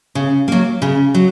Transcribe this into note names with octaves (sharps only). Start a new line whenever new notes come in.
C#3
F#3 A#3
C#3
F#3